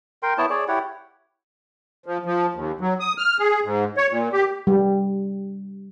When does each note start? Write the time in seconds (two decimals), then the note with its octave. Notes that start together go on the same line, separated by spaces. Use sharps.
0.23 A#4 G5 C6
0.38 B3 E4 C#5 A5
0.50 G#4 C#5 D5
0.68 E4 G4 C#5 F#5
2.06 F3
2.25 F3
2.54 D#2
2.81 F#3
3.00 D#6
3.18 F6
3.40 G#4
3.64 G#2
3.97 C#5
4.10 A#2
4.33 G4
4.67 G3